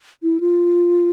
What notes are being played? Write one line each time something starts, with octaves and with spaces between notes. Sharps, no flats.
E4
F4